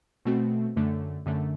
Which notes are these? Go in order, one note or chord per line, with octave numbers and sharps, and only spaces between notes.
B2 A3 C4 F#4
F#2 D3 A3
F#2 D3 A3